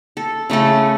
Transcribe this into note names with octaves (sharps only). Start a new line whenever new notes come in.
A4
C#3 A3 E4 A4